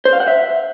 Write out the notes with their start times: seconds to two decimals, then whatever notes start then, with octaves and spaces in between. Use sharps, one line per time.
0.05 C5
0.13 F5
0.20 F#5
0.28 E5